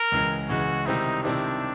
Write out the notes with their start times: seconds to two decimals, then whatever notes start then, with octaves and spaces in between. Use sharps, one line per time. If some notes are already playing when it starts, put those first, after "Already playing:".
Already playing: A#4
0.12 C#2 C#3 E3 G#3
0.49 C#2 C#3 E3 G#3 F#4
0.86 C3 D#3 G3 C4 D#4 E4
1.24 C3 D#3 G3 C4 D4 E4